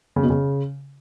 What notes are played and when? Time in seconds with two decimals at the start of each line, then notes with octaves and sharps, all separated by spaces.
0.16 C#3
0.23 B2
0.30 C#3